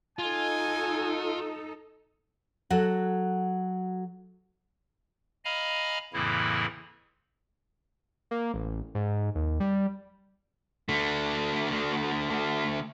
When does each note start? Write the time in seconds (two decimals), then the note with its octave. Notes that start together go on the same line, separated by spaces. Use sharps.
0.19 D#4 F4 A4 G#5
2.70 F#3 F#4 A4 F#5
5.45 D#5 F5 G#5 A#5 B5 F6
6.13 F2 A2 C#3 E3 A#3 E4
8.31 A#3
8.54 A1
8.95 G#2
9.35 D#2
9.60 G3
10.89 D3 A3